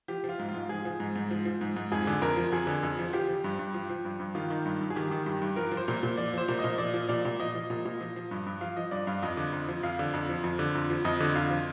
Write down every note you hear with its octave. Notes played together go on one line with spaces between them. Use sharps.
F3 G4
F3
F4
G#2
F4
G#2
F3 G#4
F3
G#2
G#2
F3
F3
G#2
G#2
F2 G#4
D3
F2 A#4
F3
F2 G#4
D3
F2
F3
F3 G4
F3
G2
G2
F3
F3
G2
G2
D#3 F4
D#3
G2
G2
G#4
D#3 G4
D#3
G2 G4
G2
F3 A#4
F3
C5
A#2
A#2
F3 D5
F3 C5
A#2
D#5
A#2
F3 D5
F3
A#2 D5
A#2
F3 D#5
F3
A#2
A#2
F3
F3
G2
G2
F3 F5
F3 D#5
G2 D5
G2 F5
F2 D#5
D3
F2
F3
F2 F5
D3
F2
F3
F2
D3
F2
F3
F2 D#5
D3
F2 F5
F3